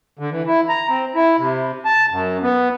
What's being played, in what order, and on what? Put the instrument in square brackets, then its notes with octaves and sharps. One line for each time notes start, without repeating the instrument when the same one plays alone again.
[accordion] D3
E3
E4
A#5
C4
E4
C3
A5
F#2
B3